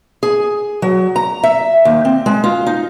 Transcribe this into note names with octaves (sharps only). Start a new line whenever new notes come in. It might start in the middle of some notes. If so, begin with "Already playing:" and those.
G#4
F#3
A#5
E5
D#2
C4
G#3
F4
D#4